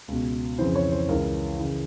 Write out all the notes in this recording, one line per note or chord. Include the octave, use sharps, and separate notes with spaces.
C#2 B2
F2 C#3 E3 C5
C#5
C5
C#2 C#3 E3 A#4
C#3 E3